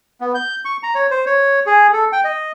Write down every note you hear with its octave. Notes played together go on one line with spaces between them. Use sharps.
B3
G6
C#6
A#5
C#5
C5
C#5
G#4
A4
G5
D#5